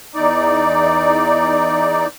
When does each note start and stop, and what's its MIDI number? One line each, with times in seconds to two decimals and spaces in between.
0.15 2.07 40
0.15 2.07 63
0.15 2.07 74